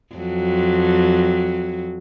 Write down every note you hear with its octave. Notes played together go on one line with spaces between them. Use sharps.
F2 F#3